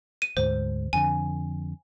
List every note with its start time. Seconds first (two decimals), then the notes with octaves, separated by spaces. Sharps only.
0.22 D#7
0.37 D2 G#2 C5
0.93 F2 D3 G#5